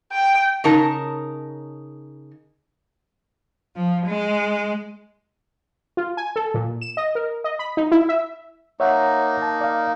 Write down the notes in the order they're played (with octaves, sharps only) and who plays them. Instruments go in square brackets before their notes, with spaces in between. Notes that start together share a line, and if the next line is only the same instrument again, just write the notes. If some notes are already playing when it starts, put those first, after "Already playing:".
[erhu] G5
[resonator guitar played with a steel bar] C#3 D#4 A#4 A5
[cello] F3
G#3
[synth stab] F4
G#5
A4
A#2
E7
D#5
A#4
D#5
B5
D#4
E4
E5
[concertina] A#3 D#4 [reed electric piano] C#5 E5 F#5
[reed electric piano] A5
D5 F5